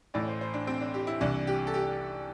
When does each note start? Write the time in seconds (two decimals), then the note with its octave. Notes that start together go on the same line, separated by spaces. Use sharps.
0.14 A1 A2 E3 D5
0.28 C5
0.41 C5
0.54 D4
0.67 C4
0.80 D4
0.94 G4
1.07 E4
1.21 C2 C3 E3 D4
1.47 G4
1.67 A4
1.74 G4